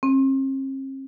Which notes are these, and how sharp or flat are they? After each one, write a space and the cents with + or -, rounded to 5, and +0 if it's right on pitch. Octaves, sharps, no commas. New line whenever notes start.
C4 +45